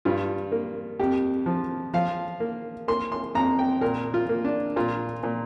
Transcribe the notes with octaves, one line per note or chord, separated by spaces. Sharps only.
G2 F4
A#3
F2 G4
F3
F3 F5
A#3
A#3 C6
C6
F2 A#5
G5
A#2 A#4
F4
A#3
D4
A#2 F4
A#2